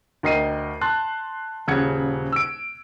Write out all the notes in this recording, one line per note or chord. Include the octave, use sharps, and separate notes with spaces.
D2 A#4 D#5 G5 C7 D#7
A5 C6 F#6 A6
D#1 C#3 F#5 G#6 C#7
E6 D7